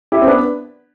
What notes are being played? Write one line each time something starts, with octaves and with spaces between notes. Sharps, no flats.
E4 G4
C4
B3 D4